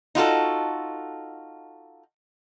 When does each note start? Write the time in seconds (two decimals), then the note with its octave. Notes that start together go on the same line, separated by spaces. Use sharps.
0.15 D#4 F4 F#4 A4